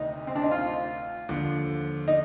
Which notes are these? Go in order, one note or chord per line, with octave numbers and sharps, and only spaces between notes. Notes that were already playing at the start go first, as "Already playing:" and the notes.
Already playing: D2 C3 D#3 D#4
C4
D4
D#4
F4
D#2 D3 F3
D#4